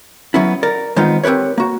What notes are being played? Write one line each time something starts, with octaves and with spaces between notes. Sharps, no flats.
F#3 B3 C#4 E4
A#4 D5
D#3 G#3 B3 C4 D#4 F4
C4 G4 A#4 B4 C#5
A#3 F#4